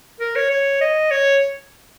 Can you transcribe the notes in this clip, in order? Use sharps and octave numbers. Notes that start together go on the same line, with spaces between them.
A#4
C#5
C#5
D#5
C#5